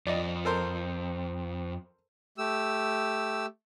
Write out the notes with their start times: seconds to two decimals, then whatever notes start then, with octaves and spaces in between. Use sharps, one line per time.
0.07 F2 D5 D#5
0.45 A4 A#4 C5
2.38 A3 G4 E6